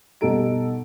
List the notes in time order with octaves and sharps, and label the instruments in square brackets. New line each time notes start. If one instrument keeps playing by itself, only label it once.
[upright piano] B2 G3 D#4 A4 A#5 D7